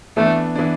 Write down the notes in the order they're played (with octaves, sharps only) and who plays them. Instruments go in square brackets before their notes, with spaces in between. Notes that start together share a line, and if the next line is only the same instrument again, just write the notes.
[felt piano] E3 B3 D4 [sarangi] A3
[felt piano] E3 B3 D4